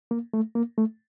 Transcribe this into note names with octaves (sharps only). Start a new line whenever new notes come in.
A#3
A3
A#3
A3